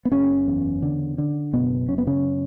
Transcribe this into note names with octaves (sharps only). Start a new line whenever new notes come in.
B3
F#1 C#3 C#4
E2
D3
D3
F#1 B2 B3
F#2 C#4
B3
C#3 C#4